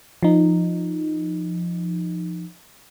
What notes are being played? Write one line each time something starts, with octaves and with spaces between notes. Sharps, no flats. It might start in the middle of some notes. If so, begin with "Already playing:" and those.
F3 D#4